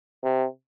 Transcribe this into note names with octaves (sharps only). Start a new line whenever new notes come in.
C3